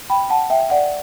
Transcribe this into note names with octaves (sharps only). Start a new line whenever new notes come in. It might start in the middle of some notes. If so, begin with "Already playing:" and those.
G5 B5
F#5 A5
E5 G5
D5 F#5